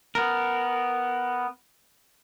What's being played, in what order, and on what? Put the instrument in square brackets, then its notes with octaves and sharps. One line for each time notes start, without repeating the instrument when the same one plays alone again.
[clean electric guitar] B3 A#4